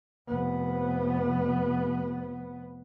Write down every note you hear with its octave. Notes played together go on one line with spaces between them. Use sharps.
F1 B3